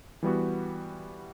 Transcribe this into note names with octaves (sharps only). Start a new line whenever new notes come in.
E3 G3 B3 F#4